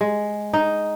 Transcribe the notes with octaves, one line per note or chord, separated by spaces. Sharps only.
G#3
D#4